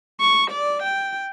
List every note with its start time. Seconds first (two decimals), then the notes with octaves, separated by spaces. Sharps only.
0.21 C#6
0.51 D5
0.83 G5